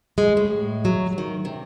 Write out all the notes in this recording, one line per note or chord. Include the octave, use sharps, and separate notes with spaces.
G#3
A2
F#3
D#3
C3